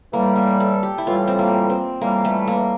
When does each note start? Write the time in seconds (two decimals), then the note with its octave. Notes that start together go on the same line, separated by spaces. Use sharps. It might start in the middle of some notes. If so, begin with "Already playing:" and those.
0.13 A2 E3 G3 A#3
0.36 A#3
0.60 A4
0.83 G4
0.98 E4
1.07 A2 E3 G3 F4
1.27 C4
1.39 A#3
1.70 C4
2.01 A2 E3 G3 A#3
2.25 A3
2.48 A#3